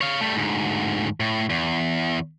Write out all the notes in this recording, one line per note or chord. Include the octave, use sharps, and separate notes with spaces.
C#5 F5
G3 A3
D2 G#2
A2
E2